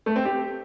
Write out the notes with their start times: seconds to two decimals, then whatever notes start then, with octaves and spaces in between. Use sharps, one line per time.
0.06 A3
0.16 C4
0.25 G4